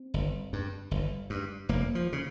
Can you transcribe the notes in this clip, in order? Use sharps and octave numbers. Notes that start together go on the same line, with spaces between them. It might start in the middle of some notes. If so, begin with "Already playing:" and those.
Already playing: C4
G1
G2
G1
G2
F1 A#3
F3
C#3